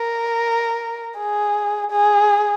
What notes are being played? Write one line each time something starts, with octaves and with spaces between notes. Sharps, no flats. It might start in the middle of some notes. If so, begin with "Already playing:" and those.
Already playing: A#4
G#4
G#4